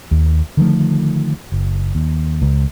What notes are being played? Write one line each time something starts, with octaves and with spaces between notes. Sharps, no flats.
D#2
D3 D#3 F3 A3
F#1
D#2
C#2